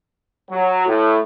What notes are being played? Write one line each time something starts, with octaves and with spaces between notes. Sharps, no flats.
F#3
A2